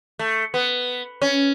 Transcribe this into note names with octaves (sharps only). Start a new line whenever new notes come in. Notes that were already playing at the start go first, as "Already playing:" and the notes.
A3
B3
C#4